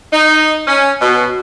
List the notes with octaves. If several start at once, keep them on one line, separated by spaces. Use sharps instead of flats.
D#4
C#4
B2